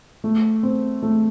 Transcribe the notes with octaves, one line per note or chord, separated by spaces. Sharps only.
A3
C4
A3